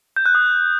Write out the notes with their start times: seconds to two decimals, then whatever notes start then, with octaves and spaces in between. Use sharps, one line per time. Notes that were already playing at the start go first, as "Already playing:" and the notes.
0.16 G6
0.26 F#6
0.35 D#6